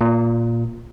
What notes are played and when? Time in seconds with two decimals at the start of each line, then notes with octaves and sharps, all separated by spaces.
0.01 A#2